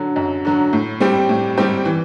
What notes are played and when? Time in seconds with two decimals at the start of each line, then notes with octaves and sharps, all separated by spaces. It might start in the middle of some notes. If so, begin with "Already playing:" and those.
Already playing: D3 F#3
0.16 F#2
0.45 D3 F#3
0.73 A2
1.00 G3 C4 G4
1.29 A2
1.58 G3 C4 G4
1.85 E3